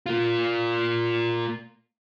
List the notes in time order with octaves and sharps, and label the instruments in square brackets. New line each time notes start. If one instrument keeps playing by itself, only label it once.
[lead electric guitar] A#3 F4